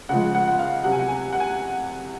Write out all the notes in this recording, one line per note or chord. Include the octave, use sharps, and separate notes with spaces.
C#3 F3 G#3 F#5
F#5
F#5
F5
C3 F#3 F#5
G#5
F#5
G#5
F#5
G#5